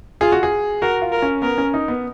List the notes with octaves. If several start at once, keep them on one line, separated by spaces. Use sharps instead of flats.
F4 G#4
F#4
G#4
F#4 A#4
F4
A#4
C#4
B3 A#4
C#4
D#4
B3